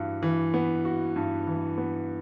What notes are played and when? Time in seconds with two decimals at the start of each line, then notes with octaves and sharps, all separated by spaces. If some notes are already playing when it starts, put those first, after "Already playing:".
Already playing: G2 E3 F#4
0.23 E3
0.54 B3
0.85 F#4
1.16 G2
1.47 E3
1.78 B3